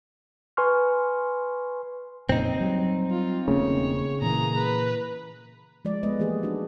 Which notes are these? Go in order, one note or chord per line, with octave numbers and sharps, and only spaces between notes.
B4 G#5 C6 C#6 F6
F2 A#2 C#3 C4 D#4
F#3 G3
F4
E1 C#3 A3 A#3 C#5
A#2 E3 A#3 G#4 A#5
B4
F3 G#3 D5
G#3 A3 B3 B4 D#5
E3 A#3 G4 G#4 C5
D4 D#4 F#4